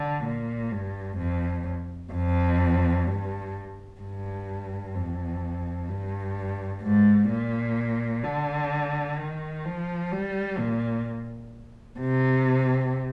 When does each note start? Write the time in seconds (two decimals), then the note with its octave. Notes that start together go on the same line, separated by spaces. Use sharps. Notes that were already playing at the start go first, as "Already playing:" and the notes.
Already playing: D3
0.24 A#2
0.71 G2
1.18 F2
2.12 F2
3.06 G2
4.00 G2
4.95 F2
5.89 G2
6.82 G#2
7.29 A#2
8.23 D3
9.18 D#3
9.64 F3
10.11 G3
10.58 A#2
11.99 C3